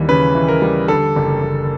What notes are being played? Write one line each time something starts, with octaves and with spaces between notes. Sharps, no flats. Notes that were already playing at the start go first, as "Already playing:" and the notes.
Already playing: D#2 E3 G3
C#3 B4
E3
A#4
G3
D3 A4
F#1
F#1